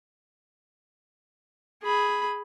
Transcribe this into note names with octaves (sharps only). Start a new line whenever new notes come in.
G#4 B5